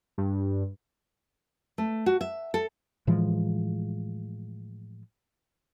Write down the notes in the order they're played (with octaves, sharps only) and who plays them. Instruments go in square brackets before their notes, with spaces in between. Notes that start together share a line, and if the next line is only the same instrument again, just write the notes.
[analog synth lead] G2
[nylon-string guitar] A3
F#4
E5
A4
[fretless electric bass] A2 E3 F3 G#3